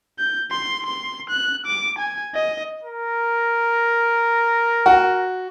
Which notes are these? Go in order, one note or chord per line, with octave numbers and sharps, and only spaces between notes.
G6
C6
C6
F#6
D6
G#5
D#5
A#4
F#4